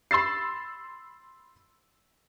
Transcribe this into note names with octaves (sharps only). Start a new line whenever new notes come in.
B5 C6 E6 A6 C7